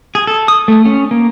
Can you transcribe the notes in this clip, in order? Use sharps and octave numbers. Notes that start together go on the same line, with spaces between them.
G#4
A4
D#6
A3
C#4
A#3